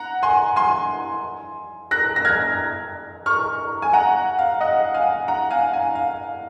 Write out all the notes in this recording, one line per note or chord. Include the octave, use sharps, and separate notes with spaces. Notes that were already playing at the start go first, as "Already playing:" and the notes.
Already playing: F#5 A#5
G#5 C6
G#5 C6
F#6 A#6
A#6
F6 G#6
C#6 F6
G#5
F#5 A#5
F5
D#5 F#5
F5 G#5
F#5 A#5
F5 G#5
F5 G#5
F5